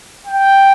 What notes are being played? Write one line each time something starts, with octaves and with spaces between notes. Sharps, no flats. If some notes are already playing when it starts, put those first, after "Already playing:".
G5